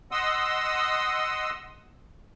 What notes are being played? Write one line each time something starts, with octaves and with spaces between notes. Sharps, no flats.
D#5 F#5 C6 D#6 E6